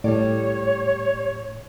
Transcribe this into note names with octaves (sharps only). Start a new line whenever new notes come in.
A2 G3 C#5 D5